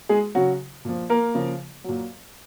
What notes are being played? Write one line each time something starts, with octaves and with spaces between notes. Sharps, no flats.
G#3 G#4
C#3 F#3 F#4
A#2 F3
A#3 A#4
C#3 F3
A#2 F#3